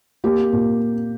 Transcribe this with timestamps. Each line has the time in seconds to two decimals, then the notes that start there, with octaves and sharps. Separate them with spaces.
0.24 A#3 G4
0.53 A#2